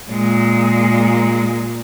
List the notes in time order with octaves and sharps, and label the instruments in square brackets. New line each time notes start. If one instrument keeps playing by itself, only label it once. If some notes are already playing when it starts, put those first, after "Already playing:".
[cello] A#2 G#3